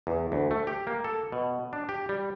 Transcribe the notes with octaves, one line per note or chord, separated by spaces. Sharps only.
E2
D2
A3
G4
A#3
A4
B2
D4
G4
G3